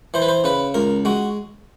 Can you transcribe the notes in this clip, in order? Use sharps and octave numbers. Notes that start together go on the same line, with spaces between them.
E3 C5
B4
C5
C#3 B4
C#2 A#4
G#3 F#4